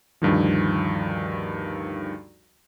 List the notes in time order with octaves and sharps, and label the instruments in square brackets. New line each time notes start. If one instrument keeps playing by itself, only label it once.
[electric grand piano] D2 G2 D#3 F3